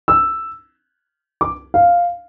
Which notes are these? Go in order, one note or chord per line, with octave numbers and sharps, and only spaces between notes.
E6
D6
F5